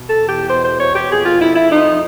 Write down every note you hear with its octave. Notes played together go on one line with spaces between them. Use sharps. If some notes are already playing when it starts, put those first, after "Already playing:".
Already playing: B2
A4
E2
G4
B2 C5
C5
B2 C#5
G4
F2 G#4
F4
F2 E4
E4
F3 D#4